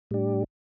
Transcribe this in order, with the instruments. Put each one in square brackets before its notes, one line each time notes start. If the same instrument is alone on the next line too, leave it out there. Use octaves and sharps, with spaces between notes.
[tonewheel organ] A2 G3 D4 G4